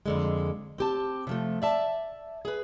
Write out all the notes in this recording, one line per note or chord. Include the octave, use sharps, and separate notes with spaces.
F2 D3 G#3
C4 G4 A5
C3 F3 A3
D5 E5 A5
G#4 B4